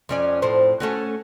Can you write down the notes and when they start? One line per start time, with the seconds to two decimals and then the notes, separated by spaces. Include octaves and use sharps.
0.09 F2 C#4 D5
0.42 F2 A2 C5
0.80 A3 C#4 F#4